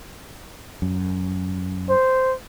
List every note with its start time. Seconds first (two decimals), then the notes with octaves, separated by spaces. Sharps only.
0.82 F#2
1.90 C5